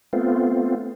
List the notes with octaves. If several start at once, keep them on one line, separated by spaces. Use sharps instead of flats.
A3 B3 C4 F4